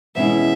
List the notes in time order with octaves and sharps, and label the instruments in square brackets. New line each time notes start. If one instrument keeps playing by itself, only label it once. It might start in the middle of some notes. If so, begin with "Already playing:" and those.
[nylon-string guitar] E2 B2 G#3 C#4 E4 [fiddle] E5